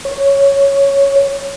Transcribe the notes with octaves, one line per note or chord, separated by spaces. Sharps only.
C#5